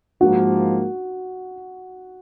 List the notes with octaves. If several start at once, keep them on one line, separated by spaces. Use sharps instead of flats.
G#2 F3 A#3 F#4